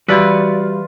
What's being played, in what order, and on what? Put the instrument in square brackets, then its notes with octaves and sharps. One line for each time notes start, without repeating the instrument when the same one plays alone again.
[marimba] E3 E6 [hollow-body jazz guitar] G3 [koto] F4 B4 [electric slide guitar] F#4 D5